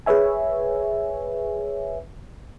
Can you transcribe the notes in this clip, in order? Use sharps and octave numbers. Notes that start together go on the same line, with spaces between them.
G#4 B4 C#5 E5 G#5